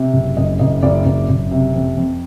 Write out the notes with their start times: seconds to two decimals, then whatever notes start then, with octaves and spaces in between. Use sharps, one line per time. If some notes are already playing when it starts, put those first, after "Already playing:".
Already playing: C3
0.14 F#1
0.37 F#1 D#5
0.59 F#1 D#5
0.83 F#1 D5
1.06 F#1
1.29 F#1
1.51 C3
1.74 F2
1.97 F2